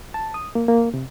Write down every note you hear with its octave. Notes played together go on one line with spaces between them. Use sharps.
A5
D#6
A#3
A#3
C3